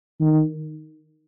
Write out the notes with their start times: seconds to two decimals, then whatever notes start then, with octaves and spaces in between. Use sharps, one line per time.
0.20 D#3